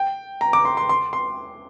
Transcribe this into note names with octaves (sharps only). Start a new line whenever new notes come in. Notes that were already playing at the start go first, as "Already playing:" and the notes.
Already playing: G5
A#5
D6
C6
C6
C6
C6